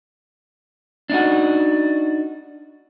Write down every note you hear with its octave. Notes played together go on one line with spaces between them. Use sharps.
D4 D#4 F#4